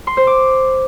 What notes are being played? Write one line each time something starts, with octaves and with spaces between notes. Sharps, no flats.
C6
C5
D6